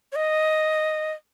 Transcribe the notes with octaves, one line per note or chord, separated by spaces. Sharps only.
C#5
D#5